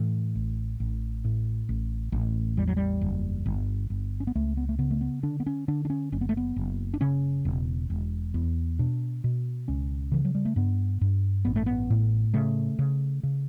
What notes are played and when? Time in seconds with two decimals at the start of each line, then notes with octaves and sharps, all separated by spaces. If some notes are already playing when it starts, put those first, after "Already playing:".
Already playing: A2 E3
0.35 A1
0.80 A1
1.25 A2
1.69 A1
2.12 A1
2.57 E2 G3
2.67 F#3
2.77 G3
3.01 F#1
3.46 G1
3.90 G1
4.20 C#4
4.27 B3
4.35 C#2 A3
4.57 B3
4.69 A3
4.79 C#3 B3
4.91 A3
5.01 B3
5.23 D3 D4
5.40 B3
5.47 C#4
5.68 D3 D4
5.85 D4
5.90 C#4
6.12 F#1 C#4
6.21 B3
6.29 A3
6.37 B3
6.56 F#1
6.94 D4
7.01 C#3 C#4
7.45 E1
7.90 E1
8.34 E2
8.79 B2 D4
9.24 B2
9.68 C#2 C#4
10.12 C#3 E3
10.25 F#3
10.35 G3
10.45 A3
10.56 G2 B3
11.01 G2
11.45 A1 B3
11.56 A3
11.66 B3
11.90 A2
12.34 C#3 A3
12.79 C#3
13.23 C#3